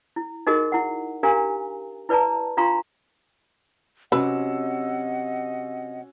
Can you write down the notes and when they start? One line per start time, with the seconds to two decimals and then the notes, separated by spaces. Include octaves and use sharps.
0.16 E4
0.47 D#4 F#4 G#4 A#4 D#5
0.72 E4 F#5
1.23 D4 G4 A#4 F5 G#5 A#5
2.09 E4 B4 D5 A5 A#5
2.57 D4 F4 F5 A#5 C6 C#6
4.12 C3 F#3 C#4 F#4 B4 D#5 F#5 E6